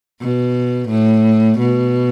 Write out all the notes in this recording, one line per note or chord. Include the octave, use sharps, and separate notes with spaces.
B2
A2
B2